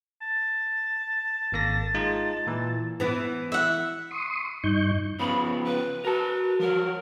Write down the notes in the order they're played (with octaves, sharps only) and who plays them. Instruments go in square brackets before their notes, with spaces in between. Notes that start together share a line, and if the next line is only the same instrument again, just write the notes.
[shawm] A5
[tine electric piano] G#1 A#3 A#6
G#3 D#4 F4
A#2 E3
[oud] E3 B3 E4
[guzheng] E5 F#5
[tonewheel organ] C6 C#6 D#6
G2 D#4 C#6 G6
[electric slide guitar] C#3 F3 B3 [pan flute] B5
[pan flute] B4
[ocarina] F#4 [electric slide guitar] A#4 A5
[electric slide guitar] F3 F#3 [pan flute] A#4